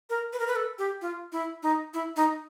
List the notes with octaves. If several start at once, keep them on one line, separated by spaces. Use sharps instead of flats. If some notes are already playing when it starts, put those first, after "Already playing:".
A#4
B4
A#4
B4
A4
G4
F4
E4
D#4
E4
D#4